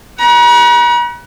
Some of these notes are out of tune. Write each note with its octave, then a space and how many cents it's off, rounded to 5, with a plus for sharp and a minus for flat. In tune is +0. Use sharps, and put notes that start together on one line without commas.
F#5 +25 A#5 +45